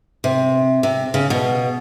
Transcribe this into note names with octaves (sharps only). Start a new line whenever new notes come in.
C3
C3
C#3
B2